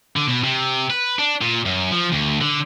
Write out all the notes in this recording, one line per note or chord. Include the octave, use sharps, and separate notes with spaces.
D3
B2
C3
B4
D4
A#2
F#2
F3
D2
D3